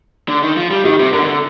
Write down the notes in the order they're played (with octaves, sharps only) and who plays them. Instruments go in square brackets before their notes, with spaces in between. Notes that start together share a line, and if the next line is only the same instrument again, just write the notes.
[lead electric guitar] D3
D#3
F3
G3
[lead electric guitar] D#3 [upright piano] G4
[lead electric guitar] C3
[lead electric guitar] D3 [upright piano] A#4
[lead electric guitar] D#3
D3